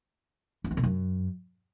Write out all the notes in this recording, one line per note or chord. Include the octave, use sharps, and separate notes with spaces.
F2
E2
B2
F#2